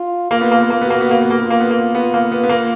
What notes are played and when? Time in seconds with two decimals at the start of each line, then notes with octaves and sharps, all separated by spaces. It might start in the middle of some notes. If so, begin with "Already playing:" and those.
Already playing: F4
0.31 A#3 F4
0.41 B3
0.52 A#3
0.61 B3
0.70 A#3
0.81 B3 F#4
0.90 A#3
1.01 B3
1.11 A#3
1.21 B3
1.31 A#3
1.40 B3 F4
1.50 A#3
1.60 B3
1.71 A#3
1.95 B3 F4
2.14 A#3
2.32 B3
2.44 B3
2.49 A#3